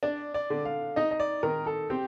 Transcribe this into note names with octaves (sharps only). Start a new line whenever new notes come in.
D4 D5
D5
D3
F5
D#4 D#5
D#5
D5
D#3 A#4
A4
C4 G4